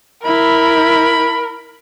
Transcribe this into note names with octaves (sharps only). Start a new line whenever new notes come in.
E4 A#4 B5